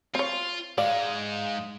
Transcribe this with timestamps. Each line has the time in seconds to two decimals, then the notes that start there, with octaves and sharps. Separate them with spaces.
0.15 C4 F4 C#5
0.78 G#2 G#3 D5 F5